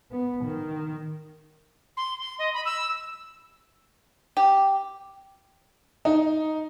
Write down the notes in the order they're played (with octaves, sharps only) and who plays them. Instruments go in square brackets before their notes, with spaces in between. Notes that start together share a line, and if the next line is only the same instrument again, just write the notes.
[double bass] B3
D#3
[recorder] C6
C6
D#5
B5
E6
[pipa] G4
[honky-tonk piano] D#4